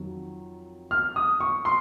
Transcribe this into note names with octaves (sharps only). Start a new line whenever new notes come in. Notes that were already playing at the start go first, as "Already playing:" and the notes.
Already playing: F2 D#3 F#3
F6
D#6
C#6
C6